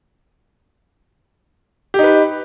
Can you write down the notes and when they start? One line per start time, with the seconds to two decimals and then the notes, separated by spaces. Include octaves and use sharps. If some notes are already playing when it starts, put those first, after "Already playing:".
1.94 G4
1.99 D#4
2.04 B4